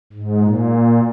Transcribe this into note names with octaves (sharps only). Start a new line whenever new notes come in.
G#2
A#2